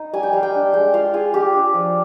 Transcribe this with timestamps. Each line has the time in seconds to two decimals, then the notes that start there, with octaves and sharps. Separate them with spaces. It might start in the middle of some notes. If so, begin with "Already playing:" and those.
Already playing: D#4
0.13 G3 G#5
0.23 G5
0.33 G3 F5
0.43 G5
0.53 D4
0.74 G#3 G5
0.94 F4 F5
1.14 F4 G#4
1.33 F4 G4
1.54 D4
1.74 F3